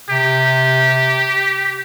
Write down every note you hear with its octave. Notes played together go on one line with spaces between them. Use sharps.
C3 G4